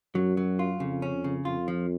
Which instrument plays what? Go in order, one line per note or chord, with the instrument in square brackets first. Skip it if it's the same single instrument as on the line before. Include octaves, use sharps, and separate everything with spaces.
[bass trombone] F#2 [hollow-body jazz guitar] F#3
[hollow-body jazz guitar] F#3
F4
[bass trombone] F2 [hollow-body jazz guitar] C#3
[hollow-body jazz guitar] C#4
C#3
[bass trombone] F2 [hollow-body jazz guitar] F4
[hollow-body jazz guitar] F3